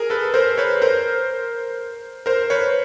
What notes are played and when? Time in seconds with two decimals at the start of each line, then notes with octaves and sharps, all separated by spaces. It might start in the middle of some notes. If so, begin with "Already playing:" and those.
Already playing: G#4 A#4
0.10 A4 B4
0.34 A#4 C5
0.58 B4 C#5
0.82 A#4 C5
2.26 A#4 C5
2.50 B4 C#5